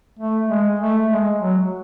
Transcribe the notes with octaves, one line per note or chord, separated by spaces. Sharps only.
A3
G#3
A3
G#3
F#3